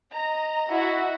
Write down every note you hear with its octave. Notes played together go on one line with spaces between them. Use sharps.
D#5 A#5
E4 F#4